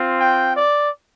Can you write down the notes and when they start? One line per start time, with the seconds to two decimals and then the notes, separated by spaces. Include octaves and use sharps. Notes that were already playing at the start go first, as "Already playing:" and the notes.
Already playing: C4 F4
0.20 G5
0.57 D5